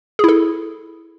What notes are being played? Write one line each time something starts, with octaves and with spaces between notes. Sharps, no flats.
E4 G#4 A4